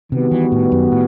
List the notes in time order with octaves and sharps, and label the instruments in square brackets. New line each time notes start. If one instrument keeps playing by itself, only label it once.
[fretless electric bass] C3 [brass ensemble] D#3 G3 B3 F#4
[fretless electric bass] E3
A2
F#2
A2